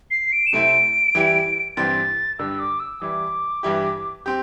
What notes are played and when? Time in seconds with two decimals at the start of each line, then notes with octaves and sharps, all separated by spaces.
0.11 C7
0.32 D7
0.46 E7
0.53 C3 A3 C4 E4 D7
1.15 E3 G3 E4 G4
1.77 G2 E3 C4 G4 A6
2.39 G2 D3 G3 E6
2.59 D6
2.80 E6
3.01 E3 G3 E4 D6
3.63 G2 E3 G3 E4 G4
4.26 C4 G4 G6